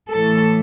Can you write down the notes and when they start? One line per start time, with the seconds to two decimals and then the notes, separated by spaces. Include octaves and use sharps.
0.11 A2 E3 A3 A4